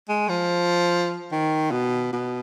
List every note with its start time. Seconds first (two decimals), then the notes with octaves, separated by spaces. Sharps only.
0.09 G#3
0.28 F3
1.32 D#3
1.71 B2
2.13 B2